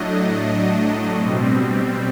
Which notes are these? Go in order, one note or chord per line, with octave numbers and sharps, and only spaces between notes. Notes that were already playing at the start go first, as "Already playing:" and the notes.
Already playing: A2 F#3 A3 D4 D#5
B2 G3 C4